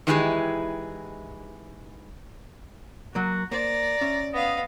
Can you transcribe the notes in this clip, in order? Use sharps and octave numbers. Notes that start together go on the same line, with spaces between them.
D#3 E3 G#3 E4 G4 G#4
F#3 A#3 F#4
A#3 C5 D5 A#5
C#4 E5
B3 D#5 F5